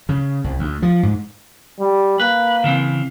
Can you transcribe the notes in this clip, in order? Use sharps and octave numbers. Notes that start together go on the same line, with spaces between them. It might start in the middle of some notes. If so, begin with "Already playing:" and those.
C#3
C2
D2
F3
G#2
G3
A#3 B4
C#3 E3 C4